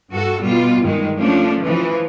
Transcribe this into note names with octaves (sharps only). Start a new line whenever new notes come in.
G2 F#4 A4
B2 G3 F4
G2 D#3 G#3
F3 A3 C#4 D4
E3 F3